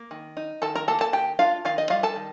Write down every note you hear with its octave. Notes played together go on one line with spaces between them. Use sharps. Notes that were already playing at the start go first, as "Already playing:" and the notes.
Already playing: A#3
D#3
D#4
D#3 A4 A5
A#4 A#5
A#3 A4 A5
A4 A5
D#3 G4 G5
D4 F4 F5
D#3 F4 F5
D#4 D#5
G3 F4 F5
A4 A5
D#3